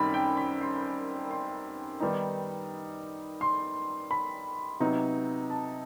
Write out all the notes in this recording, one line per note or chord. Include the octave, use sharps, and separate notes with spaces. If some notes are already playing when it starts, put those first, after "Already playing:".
Already playing: F#2 D#3 G3 C4 B5
G5
B5
C6
C6
D#3 G3 B3 D#4
C6
B5
C3 F#3 B3 D#4
A5